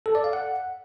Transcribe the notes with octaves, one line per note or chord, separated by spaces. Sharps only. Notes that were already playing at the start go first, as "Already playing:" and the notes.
A4
D5
F5
F#5